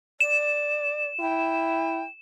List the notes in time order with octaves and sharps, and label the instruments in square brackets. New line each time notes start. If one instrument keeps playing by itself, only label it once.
[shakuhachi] D5 [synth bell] E7
[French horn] E4 [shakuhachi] G5